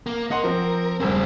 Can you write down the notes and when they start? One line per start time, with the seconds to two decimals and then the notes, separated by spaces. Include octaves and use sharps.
0.06 A#3
0.31 A#3 A#4 D#5 F#5 C6
0.44 F3 C4 A#4
1.00 E1 G2 C#3 A3 C4